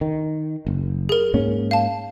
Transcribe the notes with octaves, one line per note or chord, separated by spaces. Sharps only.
D#3
F#1
G#4 A#4
G#2 A#3 C#4
F5 A5